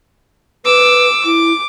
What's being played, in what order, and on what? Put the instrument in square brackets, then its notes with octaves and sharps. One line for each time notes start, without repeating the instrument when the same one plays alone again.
[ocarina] B4 [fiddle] D6 E6
[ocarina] E4 [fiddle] D6